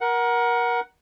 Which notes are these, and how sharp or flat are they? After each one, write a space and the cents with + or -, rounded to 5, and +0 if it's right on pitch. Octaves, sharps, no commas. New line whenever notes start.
A#4 +25 F#5 +5